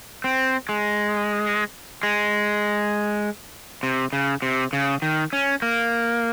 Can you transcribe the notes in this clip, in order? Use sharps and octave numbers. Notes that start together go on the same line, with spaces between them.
C4
G#3
G#3
C3
C#3
C3
C#3
D#3
C#4
A#3